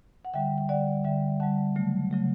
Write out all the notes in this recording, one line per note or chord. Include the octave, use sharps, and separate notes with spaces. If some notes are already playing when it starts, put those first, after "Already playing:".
F#5
D3 G3 E5 G5
G5
D3 G3 D5 F#5
D3 G3 E5 G5
D3 G3 F#5 A5
C#3 F#3 A3
C#3 F#3 A3